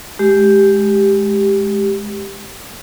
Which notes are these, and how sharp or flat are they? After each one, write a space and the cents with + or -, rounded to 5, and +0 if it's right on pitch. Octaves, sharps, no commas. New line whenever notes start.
G#3 +15 G4 +0